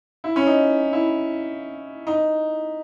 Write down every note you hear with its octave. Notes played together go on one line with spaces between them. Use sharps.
E4
C#4
D#4
E4
D#4